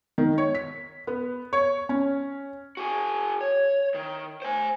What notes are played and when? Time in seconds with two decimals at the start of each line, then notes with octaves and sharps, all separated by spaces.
0.18 D#3
0.38 C#5
0.55 B6
1.07 B3
1.53 C#5
1.89 C#4
2.77 F#4 G#4
3.41 C#5
3.94 D#3
4.42 C5 G#5